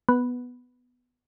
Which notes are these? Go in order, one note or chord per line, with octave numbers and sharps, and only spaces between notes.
B3